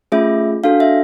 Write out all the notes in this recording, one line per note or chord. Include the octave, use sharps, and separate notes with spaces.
A3 C#4 F4 G#4 E5
D4 F#4 A4 F5
E5